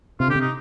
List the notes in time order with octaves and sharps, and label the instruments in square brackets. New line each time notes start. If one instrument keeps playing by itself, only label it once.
[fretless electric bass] C3 [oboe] F4
[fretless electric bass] D3 [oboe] G4
[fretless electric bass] C3
[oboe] D#4